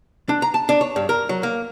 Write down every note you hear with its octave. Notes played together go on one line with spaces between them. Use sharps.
D4
A#5
A5
D4
C#5
G2
A#4
F#3
A#3